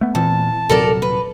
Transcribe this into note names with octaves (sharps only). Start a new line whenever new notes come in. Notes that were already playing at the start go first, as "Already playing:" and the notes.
A3 B3
E2 A#2 E3 C4 A5
D#1 C3 F#3 A4 A#4 D5
B4